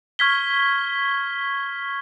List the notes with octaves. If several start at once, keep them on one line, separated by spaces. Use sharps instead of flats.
C#6 F6 G#6 B6 G7